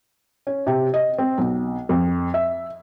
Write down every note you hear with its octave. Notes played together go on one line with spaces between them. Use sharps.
C#4
C3
D#5
C4
B1
F2
E5